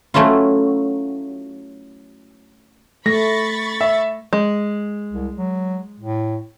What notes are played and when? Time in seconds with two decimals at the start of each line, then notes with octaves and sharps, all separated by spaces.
0.14 F#3 A3 C#4 E4 F4
3.06 A3 B5 C#6 A6 A#6
3.81 E5
4.33 G#3
5.12 C2
5.37 F#3
6.00 A2